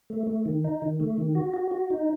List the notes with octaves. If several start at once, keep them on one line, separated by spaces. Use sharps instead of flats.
A3
A3
D#3
D#4
D#3
A3
D#3
F#4
F#4
F#4
D#4